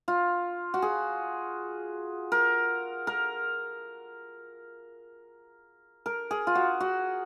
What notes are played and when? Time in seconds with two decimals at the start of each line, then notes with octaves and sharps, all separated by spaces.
0.08 F4
0.74 F#4
0.82 G#4
2.32 A#4
3.07 A#4
6.06 A#4
6.31 G#4
6.47 F4
6.55 F#4
6.80 F#4